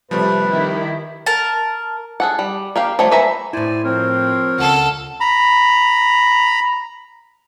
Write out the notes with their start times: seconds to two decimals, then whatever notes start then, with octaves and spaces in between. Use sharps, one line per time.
0.11 C3 F3 G3 A3 B4
0.47 D#3 E4 G4
1.26 A#4 A5
2.20 G#4 A4 F#5
2.39 G3
2.76 A#3 G4 F5
2.99 F3 G3 A3 C#5
3.11 B4 C5 E5 G#5 A#5
3.53 A2 E4 C5 D5 G#5
3.84 F3 C4 A#4 C#5
4.58 C#2 A4 F#5
5.20 A#5 B5